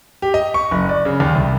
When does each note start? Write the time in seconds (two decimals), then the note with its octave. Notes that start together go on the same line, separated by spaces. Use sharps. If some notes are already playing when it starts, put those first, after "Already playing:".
0.22 G4
0.34 D#5
0.54 C#6
0.71 F#1
0.89 D5
1.05 C#3
1.20 D#2
1.35 C2